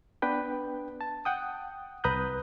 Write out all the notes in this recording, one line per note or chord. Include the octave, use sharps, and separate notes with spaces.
B3 D4 B4 G5
A5
F#5 G5 D#6
C2 B4 A#5 D#6 F#6 G6